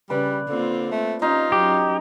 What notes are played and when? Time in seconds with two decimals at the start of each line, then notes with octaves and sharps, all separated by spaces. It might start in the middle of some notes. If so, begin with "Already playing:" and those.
0.10 C#3 G3 B4 D5
0.49 D3 A#3 C4 F4
0.92 A3
1.22 C#4 D#4 F4 G4
1.52 F#3 C#4 G4